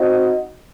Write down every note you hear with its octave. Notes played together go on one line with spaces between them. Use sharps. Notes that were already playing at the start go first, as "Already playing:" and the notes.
Already playing: C4 D#4 F#4 C5 D#5